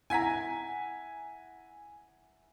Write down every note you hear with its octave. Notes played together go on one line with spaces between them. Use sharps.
E4 F#5 G#5 A#5 G#6 B6